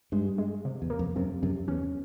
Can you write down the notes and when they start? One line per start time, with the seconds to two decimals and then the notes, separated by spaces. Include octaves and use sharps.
0.12 G2 G#3
0.38 G#3
0.65 C3
0.82 E2
0.90 A#3
0.99 F2
1.16 F#2 C3
1.43 F#2 C3
1.68 E2 C#4